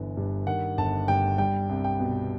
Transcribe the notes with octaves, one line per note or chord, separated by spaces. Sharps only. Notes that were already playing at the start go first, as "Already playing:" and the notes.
Already playing: G1 E3
G2
D#3 F#5
G1 A5
G2 G5
G3 G5
C2
G5
B2